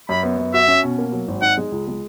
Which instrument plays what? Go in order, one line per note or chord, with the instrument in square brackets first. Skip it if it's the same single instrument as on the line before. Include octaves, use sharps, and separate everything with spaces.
[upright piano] F#2 [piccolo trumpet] B5
[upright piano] B3
F#2
[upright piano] F#4 [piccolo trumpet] E5
[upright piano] C#4
B2
A#3
F#3
G#1
[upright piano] D#4 [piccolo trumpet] F#5
[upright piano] G#3
C#2
G#3